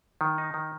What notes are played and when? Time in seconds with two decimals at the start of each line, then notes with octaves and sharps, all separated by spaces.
0.21 D#3
0.38 D#4
0.54 D#3